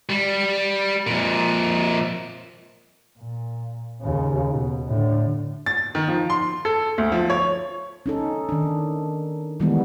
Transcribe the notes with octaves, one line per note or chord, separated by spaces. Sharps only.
G3
F2 A#2
A#2
D#2 C#3
B2
A2 D3
A6
D#3
F3
C6
A4
D2
F3
C#5
C#4 D#4 A4
D#3 D4
D#3 E3 G3 G#3 B3